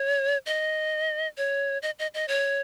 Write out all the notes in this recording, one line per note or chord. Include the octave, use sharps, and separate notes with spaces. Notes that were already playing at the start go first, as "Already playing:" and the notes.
Already playing: C#5
D#5
C#5
D#5
D#5
D#5
C#5